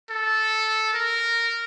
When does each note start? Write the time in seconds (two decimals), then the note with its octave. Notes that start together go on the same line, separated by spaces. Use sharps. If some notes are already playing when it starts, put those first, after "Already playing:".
0.10 A4
0.94 A#4